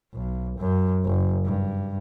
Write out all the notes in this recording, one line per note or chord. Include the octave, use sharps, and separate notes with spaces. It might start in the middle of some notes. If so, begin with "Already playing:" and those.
B1
F#2
F#1
G2